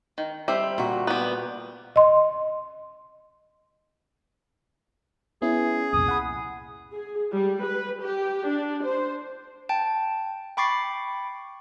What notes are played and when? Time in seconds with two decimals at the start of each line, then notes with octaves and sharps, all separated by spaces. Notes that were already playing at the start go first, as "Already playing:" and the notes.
0.18 D#3
0.48 G3 C5 E5
0.78 A#2 F#4
1.07 G3 B3
1.96 D#5 C6
5.42 B3 C#4 E4 G#4
5.93 C2 F2 A#2 D#6
6.08 F#5 B5
6.95 G#4
7.35 G3
7.65 B4
8.04 G4
8.48 D4
8.85 C5
9.69 G5 A5
10.57 G5 B5 C#6 D6 A6 C7